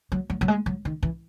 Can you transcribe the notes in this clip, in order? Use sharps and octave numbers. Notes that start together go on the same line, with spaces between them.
F#3
F#3
F#3
G#3
F#3
D#3
E3